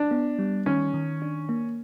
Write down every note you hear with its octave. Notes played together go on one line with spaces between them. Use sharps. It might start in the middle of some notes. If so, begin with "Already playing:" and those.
Already playing: D4
B3
G3
D#3 C#4
D#3
D4
A#3